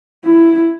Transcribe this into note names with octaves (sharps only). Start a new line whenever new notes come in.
E4